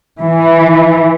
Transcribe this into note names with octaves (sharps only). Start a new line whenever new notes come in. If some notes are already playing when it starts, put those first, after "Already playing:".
E3